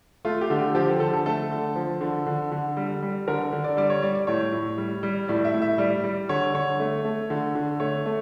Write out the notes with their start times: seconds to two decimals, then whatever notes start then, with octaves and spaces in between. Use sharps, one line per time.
0.25 A3 F4
0.41 G4
0.50 D3
0.59 G4
0.75 F3 G4
0.88 A4
1.00 D3 A4
1.13 A4
1.26 A3 A4
1.51 D3
1.76 F3
2.01 D3
2.26 D3
2.52 D3
2.77 G3
3.02 G3
3.28 D3 A#4
3.53 D3
3.64 D5
3.77 G3 D5
3.90 C#5
4.02 G3 D5
4.15 D5
4.27 A2 C#5
4.52 A2
4.78 G3
5.03 G3
5.28 A2 D5
5.45 E5
5.54 A2
5.62 E5
5.78 G3 D5
6.04 G3
6.29 D3 C#5
6.54 D3 C#5
6.80 A3
7.04 A3
7.30 D3
7.55 D3
7.80 A3 C#5
8.06 A3